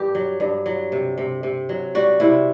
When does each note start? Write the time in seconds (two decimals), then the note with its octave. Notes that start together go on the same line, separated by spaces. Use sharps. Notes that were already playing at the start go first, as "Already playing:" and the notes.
Already playing: G2 G4
0.15 F#3
0.40 G2
0.66 F#3
0.92 C3
1.18 C3
1.43 C3
1.69 F#3
1.95 G3 F#4
2.20 C3 E4